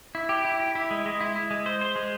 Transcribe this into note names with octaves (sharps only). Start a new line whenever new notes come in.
E4
G4
E4
G4
E4
G#3
G#3
E4
E4
G#3
C5
C5
G#3